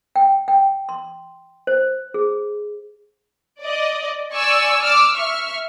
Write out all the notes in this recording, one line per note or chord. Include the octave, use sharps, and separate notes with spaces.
G5
G5
C6
C5
G#4
D5 D#5
D5 G#5 C#6 E6
D6 E6 F6
E5 C#6 F6